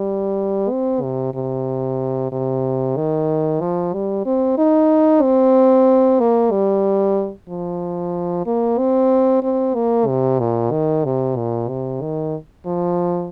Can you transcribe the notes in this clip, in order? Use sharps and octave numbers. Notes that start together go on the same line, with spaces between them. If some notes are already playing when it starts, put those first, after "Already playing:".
Already playing: G3
C4
C3
C3
C3
D#3
F3
G3
C4
D#4
C4
A#3
G3
F3
A#3
C4
C4
A#3
C3
A#2
D#3
C3
A#2
C3
D#3
F3